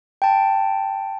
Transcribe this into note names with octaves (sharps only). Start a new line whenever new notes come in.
G5 A5